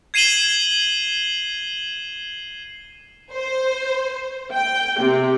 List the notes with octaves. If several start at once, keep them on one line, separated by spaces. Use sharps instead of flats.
G#6 C7 D#7 E7 F#7 G7
C5
G5
C3